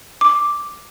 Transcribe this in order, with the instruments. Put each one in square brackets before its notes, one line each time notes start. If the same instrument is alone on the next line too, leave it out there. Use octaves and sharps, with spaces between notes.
[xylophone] D6